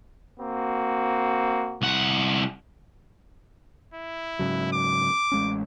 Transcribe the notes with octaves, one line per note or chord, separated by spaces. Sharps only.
A#3 C4 F#4
C2 F#5
E4
G#2 C#3 F#3
D6
A1 G#3 C#4